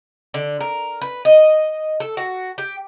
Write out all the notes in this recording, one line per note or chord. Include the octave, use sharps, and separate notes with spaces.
D3
A#4
B4
D#5
A4
F#4
G4